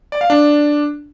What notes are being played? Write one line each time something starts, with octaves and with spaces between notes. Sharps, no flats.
D5
F5
D4